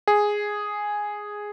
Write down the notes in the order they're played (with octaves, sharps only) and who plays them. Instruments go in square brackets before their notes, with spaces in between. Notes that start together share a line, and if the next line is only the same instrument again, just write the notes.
[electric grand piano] G#4